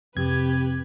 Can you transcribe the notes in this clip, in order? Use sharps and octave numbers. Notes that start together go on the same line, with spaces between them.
F2 C3 G4 B4 G#6